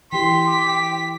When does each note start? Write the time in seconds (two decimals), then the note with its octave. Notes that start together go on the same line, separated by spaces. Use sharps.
0.13 E3 G4 G5 C6 B6
0.47 D6